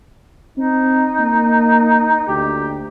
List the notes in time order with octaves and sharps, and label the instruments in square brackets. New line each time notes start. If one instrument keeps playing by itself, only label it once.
[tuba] C4 [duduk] D#4
[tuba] A#3
[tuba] D2 [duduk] G4